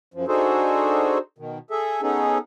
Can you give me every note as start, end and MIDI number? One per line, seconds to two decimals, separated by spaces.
0.14 0.25 42
0.14 0.25 53
0.28 1.18 62
0.28 1.18 63
0.28 1.18 66
0.28 1.18 68
0.28 1.18 69
0.28 1.18 72
1.38 1.58 47
1.38 1.58 51
1.71 2.02 68
1.71 2.02 69
1.71 2.02 76
2.02 2.38 59
2.02 2.38 61
2.02 2.38 63
2.02 2.38 68
2.02 2.38 69